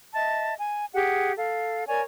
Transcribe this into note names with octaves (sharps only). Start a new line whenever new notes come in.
D#5 E5 A5
G#5
G4 G#4 F#5
A4 F5
A#4 C#5 D5 G#5